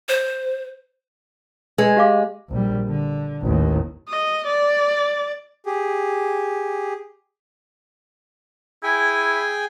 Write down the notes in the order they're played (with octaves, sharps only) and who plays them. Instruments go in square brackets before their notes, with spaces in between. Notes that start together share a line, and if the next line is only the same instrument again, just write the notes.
[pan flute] C5
[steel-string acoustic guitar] G#3 [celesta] B4 G#6
[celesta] G4 F5 D6
[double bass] A#1 G3
D3
A1 D#2
[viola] D#5
D5
[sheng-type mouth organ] G4 G#4
[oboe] E4 [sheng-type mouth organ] G#4 G5 G#5